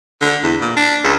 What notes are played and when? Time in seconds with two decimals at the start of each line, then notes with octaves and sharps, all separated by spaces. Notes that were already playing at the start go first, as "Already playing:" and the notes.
0.21 D3
0.43 E2
0.61 A#2
0.76 D4
1.04 C#2